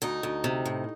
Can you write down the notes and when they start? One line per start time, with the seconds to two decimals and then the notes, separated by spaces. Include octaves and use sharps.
0.02 D2 D#4
0.23 D2
0.44 C3
0.66 A2